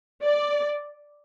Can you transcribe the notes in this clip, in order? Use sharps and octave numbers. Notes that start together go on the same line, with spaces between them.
D5